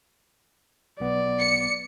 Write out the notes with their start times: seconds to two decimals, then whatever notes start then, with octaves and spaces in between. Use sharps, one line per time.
1.00 B1 B3 D5
1.40 C#7